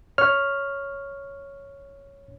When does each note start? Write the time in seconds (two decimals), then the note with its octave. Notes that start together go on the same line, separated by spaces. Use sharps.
0.18 C#5 F6